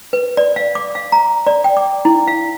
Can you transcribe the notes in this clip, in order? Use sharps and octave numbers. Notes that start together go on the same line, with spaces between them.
B4
D5
F5
D6
F5
A#5
D5
G5
D6
E4
F5